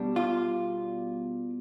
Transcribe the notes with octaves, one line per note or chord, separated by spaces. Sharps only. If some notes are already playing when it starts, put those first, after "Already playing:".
Already playing: B2 G3 D4
F4